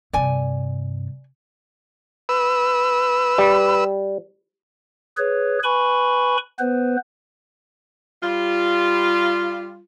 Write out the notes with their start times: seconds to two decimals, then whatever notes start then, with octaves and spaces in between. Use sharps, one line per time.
0.13 G2 C3 D5 G#5
2.29 B4 E6
3.38 G3
5.18 G#4 B4 C#5
5.64 B4 G#5 B5 C#6
6.60 B3 B4 C5
8.23 G3 F4